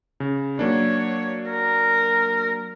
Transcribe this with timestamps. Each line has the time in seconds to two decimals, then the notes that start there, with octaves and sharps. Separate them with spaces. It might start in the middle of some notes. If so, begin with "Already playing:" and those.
0.20 C#3
0.59 F#3 A#3 D4 C#5
1.50 A#4